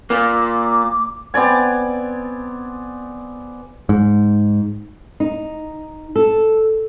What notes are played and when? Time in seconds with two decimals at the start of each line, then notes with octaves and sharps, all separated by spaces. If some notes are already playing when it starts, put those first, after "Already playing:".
0.10 A#2 A#3 D6
1.34 B3 C4 D5 G#5
3.89 G#2
5.20 D#4
6.16 A4